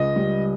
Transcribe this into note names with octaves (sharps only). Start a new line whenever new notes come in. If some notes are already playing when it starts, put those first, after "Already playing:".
Already playing: C#2 D#5
G3